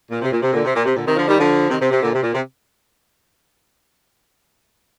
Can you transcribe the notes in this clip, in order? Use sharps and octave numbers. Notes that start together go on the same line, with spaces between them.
A#2
C3
A#2
C3
A#2 D3
C3
A#2
C3
A#2 D3
C3 D#3
D3 F3
D#3 G3
D3 F3
C3 D#3
C3
C3
A#2 D3
C3
A#2
C3